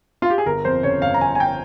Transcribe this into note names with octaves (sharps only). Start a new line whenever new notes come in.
F4
G4
G#4
G1 A#4
F2 C5
C#3 C#5
G1 F5
A#5
G1 G#5
G#5
G5